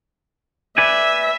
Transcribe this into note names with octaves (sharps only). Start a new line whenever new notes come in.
B4 D5 E5 G#5